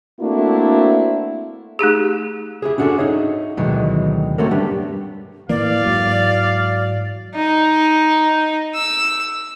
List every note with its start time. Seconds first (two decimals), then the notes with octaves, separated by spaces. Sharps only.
0.20 A3 A#3 C4 D4 E4 F#4
1.79 A3 D#4 G4 G#4
2.62 E4 G4 G#4
2.78 C#4 D4 F#4 G#4 A4
2.98 D#4 G#4 C#5 E5
3.57 D2 B2 D#3 E3 F#3 G#3
4.38 A3 C4 C#4 F#4 A4 A#4
4.51 G3 B3 D4 G4
5.49 A2 E3 A#3 D5 F5
5.84 G#2 F#3
7.35 D#4
8.74 E6